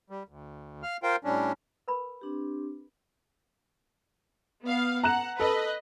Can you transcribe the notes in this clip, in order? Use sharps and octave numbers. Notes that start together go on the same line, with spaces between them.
G3
D2
F5 F6
F4 A#4 C5 F5 G5
A2 G3 C#4 D4
A#4 B4 B5
C4 D4 G4
B3 F5
F#5 A#5 F#6 E7
A4 B4 D#5